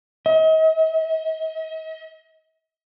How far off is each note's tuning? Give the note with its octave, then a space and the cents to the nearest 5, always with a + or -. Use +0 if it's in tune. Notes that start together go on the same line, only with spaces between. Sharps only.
D#5 +40